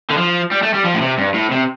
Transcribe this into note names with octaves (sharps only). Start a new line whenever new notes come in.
D3
F3
G3
A3
G3
F3
A2
C3
G2
A2
C3